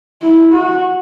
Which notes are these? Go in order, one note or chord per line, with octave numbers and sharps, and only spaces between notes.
E4
F#4